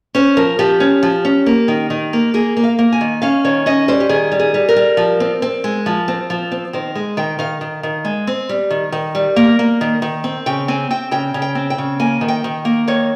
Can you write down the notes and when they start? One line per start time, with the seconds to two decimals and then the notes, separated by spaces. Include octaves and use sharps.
0.15 C#4 C5
0.37 F3 A#4
0.59 F3 G4
0.80 C#4
1.03 F3
1.25 C#4
1.46 A#3
1.68 D#3
1.90 D#3
2.13 A#3
2.34 A#3 G#4
2.57 A#3
2.64 F5
2.79 A#3
2.93 G#5
3.01 D#3
3.22 C#4 F5
3.44 D#3 C#5
3.66 C#4 D#5
3.88 G3 C5
4.00 G4
4.09 D#3 G#4
4.32 G3
4.40 G#4
4.54 G3
4.69 A#4
4.76 G3
4.97 F3
5.20 C4
5.42 C4
5.64 G#3
5.86 F3
6.08 C4
6.30 F3
6.52 C4
6.73 D#3 C5
6.95 G#3
7.17 D#3 G5
7.39 D#3 F5
7.61 D#3
7.83 D#3
8.05 G#3
8.27 C4
8.49 G3
8.71 D#3
8.92 D#3
9.15 G3
9.36 A#3
9.59 A#3
9.81 D#3
10.02 D#3
10.24 C4
10.46 C#3 G5
10.68 C4 G#5
10.91 C4 G5
11.11 C#3 G5
11.34 C#3
11.42 G5
11.55 C4
11.70 G5
11.78 C#3
12.00 A#3 G#5
12.21 D#3
12.28 G5
12.44 D#3
12.65 A#3
12.88 D#3 C#5